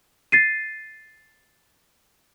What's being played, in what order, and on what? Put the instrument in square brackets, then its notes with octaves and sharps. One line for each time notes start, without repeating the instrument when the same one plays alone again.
[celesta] A6 C7 D#7